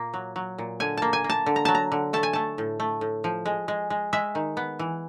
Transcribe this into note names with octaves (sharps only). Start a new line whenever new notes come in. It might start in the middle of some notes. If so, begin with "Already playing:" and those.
Already playing: A#2 A#3
F#3
F#3
A#2
D3 G#5
A#3 A5
G#5
A#3
A5
D3
A#5
F#3 A5
A#5
D3
A3 A5
G#5
A3 A5
A2
A3
A2
F3
G#3
G#3
G#3
G#3 E5
D#3
B3
E3